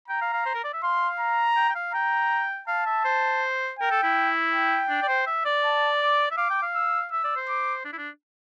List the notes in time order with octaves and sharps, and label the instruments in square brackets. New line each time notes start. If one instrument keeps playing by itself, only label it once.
[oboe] G5 [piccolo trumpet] A#5
[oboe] F5
F5
C5
A#4
D5
E5
[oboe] F5 [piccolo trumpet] C6
[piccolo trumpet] A#5
[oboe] G5
G5
F5
[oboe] G5 [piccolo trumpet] A#5
[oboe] F5 [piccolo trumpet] A5
[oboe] E5
C5
[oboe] A#4 [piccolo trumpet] G5
[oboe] A4
E4
[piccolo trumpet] G5
[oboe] D4
D5
C5
E5
D5
[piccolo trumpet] A5
D6
[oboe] E5
[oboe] F5 [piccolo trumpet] D6
[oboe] G5
F5
[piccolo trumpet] E6
[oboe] E5 [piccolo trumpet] E6
[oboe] D5
C5
[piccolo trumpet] D6
[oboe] D4
E4
D4